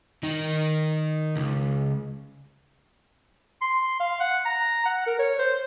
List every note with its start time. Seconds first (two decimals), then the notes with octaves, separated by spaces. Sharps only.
0.23 D#3 D#4
1.36 C#2
3.62 C6
4.00 F5
4.20 F#5
4.45 A#5
4.85 F#5
5.07 A#4
5.19 C#5
5.39 C5